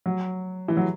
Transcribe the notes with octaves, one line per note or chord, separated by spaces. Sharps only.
F#3
E3
F#3